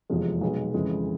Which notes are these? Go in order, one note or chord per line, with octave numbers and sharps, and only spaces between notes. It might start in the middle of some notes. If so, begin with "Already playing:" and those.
F1 E2 C3 F3 G#3
B1 B2 G#3
F2 C#3 E3 G#3